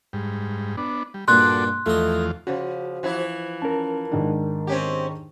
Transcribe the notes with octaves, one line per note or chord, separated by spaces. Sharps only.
G#2 G3
B3 D4
G3
G2 A#2 D4 F#4 A4 D5 C6 F#6
E2 F3 A3 F4 D#5
C#3 F3 F#4
E3 F3 E4
C#4 A#4 A5
G#2 D#3 D4
C4 C#4 G4